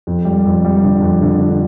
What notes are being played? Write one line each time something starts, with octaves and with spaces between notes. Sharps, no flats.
F2
G3
F2
G3
D3
F2
D3
D3